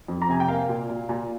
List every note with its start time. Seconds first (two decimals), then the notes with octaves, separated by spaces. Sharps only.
0.08 F2
0.22 A#5
0.29 C3 G#5
0.40 G5
0.48 A#3 F5
0.69 A#2
0.89 A#2
1.09 A#2